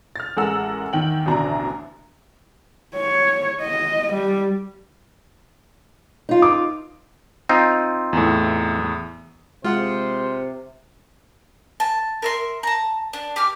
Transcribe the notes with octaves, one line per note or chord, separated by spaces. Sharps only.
F6 A6
A1 G#3 A4 A#4 F#5 E6
E2 D#3 G5 F#7
A1 D2 B2 D4 A#5
C#5
D#5
G3
D#4 F4
D6
C4 D#4 F4
E2 A2
C3 G#3 F4 C5 F#5
A5
A#4 E5 C6
A5 A#5
D4
G4 D6 F6